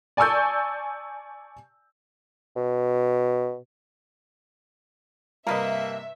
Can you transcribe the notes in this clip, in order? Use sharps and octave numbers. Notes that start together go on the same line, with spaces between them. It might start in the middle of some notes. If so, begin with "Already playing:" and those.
D5 G#5 A5 C#6 E6 G6
B2
G2 C3 A#3 A#4 B4 D#5 E5